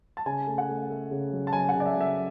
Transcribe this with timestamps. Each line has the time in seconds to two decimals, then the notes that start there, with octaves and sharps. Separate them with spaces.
0.17 A5
0.26 C#3 G#5
0.47 A3
0.58 F#5
0.69 A3
0.90 A3
1.11 C#3
1.32 F#3
1.47 A5
1.53 F#3 G#5
1.69 F#5
1.75 C#3
1.80 D5
1.86 E5
1.96 F#3 E5